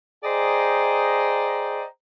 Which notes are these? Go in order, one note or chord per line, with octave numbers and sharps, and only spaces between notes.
G#4 C5 D5 D#5 G5 A#5